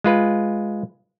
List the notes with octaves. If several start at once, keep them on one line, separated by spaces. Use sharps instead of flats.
G#3 F4 B4